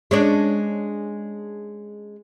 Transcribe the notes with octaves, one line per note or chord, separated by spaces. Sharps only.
G#3 C#4 D4